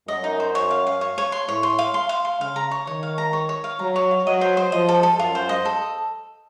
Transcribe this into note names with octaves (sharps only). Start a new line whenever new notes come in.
F#2 D#5
D#4
C5
C#5
F5
F5
C#5
C#5
C6
A2 C#5
C6
F5
C6
F5
C6
C#3 F5
A#5
C#5
D#3 C#5
F5
A#5
C#5
C#5
F5
F#3 A#5
C#5
F5
F#3 D#5
C5
C5
F3 D#5
A4
A4
F#2 F4
C5
D#5
A4